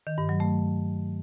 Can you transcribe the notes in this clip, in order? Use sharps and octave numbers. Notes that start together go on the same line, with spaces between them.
D#3
G2
F#3
A3